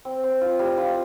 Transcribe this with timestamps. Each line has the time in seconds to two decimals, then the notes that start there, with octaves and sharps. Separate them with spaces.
0.05 C4
0.24 C4
0.41 F4
0.59 G3
0.78 F4